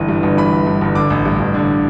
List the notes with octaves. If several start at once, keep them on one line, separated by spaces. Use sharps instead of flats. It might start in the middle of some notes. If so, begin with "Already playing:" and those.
Already playing: G1 E3
G2
G1
E3 B5
G1
G2
G1
D3 D6
A1
G2
A1
D3